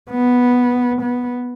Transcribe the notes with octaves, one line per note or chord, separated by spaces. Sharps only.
B3
B3